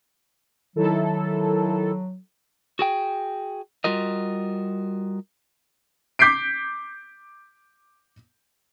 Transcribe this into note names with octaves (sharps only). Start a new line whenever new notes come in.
D#3 F#3 E4 A4
F#4 G#4 G5
G3 F4 F#4 A#4 D#5
D6 G6 B6 C7 D7